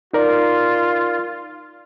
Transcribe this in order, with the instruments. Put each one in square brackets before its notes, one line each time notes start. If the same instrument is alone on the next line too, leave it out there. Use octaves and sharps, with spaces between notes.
[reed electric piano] D#4 A#4 D5 [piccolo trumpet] F4